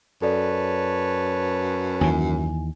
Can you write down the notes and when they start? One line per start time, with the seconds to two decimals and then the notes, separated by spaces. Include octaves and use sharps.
0.22 F#2 A4 B4 C#5 D5 A5
2.01 D#2 E3 G#5